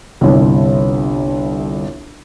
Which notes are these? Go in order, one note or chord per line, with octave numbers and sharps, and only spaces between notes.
G1 C2